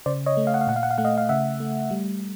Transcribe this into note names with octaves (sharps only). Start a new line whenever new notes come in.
C#3 C5 D5
C#5 D#5
A3
F5
F#5
F5
A#2 F#5
F5
F#5
F5
A3 F#5
D#5 F5
F5
C#3 E5 F#5
A3
G3